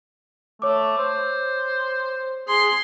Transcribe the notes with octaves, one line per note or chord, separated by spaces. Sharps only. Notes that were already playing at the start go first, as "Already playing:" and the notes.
A3 C#5 D6
C5
G#4 C6